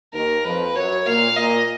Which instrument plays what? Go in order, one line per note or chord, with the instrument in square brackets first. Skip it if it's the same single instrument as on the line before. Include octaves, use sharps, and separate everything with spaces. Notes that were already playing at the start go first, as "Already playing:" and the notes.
[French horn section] D#2 D#3 [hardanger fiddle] A#4
[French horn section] F2 F3 [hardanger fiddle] B4
[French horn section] F#2 F#3 [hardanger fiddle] C#5
[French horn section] A#2 A#3 [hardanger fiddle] F5
[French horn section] A#2 A#3 [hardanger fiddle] D#5